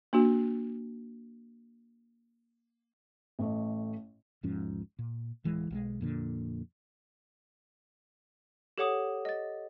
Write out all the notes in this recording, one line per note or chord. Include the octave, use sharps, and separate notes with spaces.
A#3 D4 F#4
A1 A3 D#5
E1 G#2 F3 C#4
A#2
D1 E3 G#3
B1 F3 G#3
F2 A#2 D3
G4 A4 C#5 F#5 D6 D#6
D#5 A6